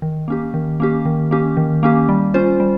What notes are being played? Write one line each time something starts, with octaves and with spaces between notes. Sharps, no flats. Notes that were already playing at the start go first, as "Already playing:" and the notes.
D#3
A#3 C#4 G4
D#3
A#3 C#4 G4
D#3
A#3 C#4 G4
D#3
A#3 C#4 G4
G3
C#4 F4 C5
G3